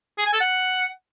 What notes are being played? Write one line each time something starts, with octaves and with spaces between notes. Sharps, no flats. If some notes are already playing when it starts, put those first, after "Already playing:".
G#4
G#5
A4
F#5